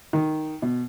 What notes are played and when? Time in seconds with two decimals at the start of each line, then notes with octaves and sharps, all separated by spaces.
0.13 D#3
0.62 B2